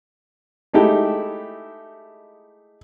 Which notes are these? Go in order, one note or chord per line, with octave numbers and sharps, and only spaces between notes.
G#3 A3 D#4 E4 G4